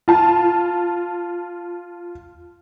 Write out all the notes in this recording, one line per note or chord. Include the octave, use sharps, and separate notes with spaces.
F4 A5